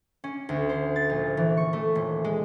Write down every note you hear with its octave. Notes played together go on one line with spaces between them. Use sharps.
C#4
D2
C5
A6
A#1
E3
C#6
A3
D#1
G#3